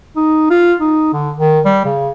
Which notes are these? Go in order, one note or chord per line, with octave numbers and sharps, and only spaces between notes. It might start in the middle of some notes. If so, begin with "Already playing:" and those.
D#4
F4
D#4
D3
D#3
G3
C#3